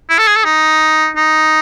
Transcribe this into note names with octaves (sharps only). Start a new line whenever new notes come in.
E4
A4
G#4
A4
D#4
D#4